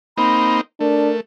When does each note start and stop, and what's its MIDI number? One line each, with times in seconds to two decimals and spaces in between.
0.17 0.61 58
0.17 0.61 60
0.17 0.61 63
0.17 0.58 83
0.80 1.21 57
0.80 1.10 62
0.80 1.18 70